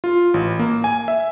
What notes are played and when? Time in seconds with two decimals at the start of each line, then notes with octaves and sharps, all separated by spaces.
0.04 F4
0.34 A1
0.59 A#3
0.84 G#5
1.08 E5